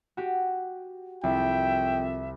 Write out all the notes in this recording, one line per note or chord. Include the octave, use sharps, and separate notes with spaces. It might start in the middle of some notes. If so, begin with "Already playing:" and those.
F#4 G4
C2 F2 E5 G5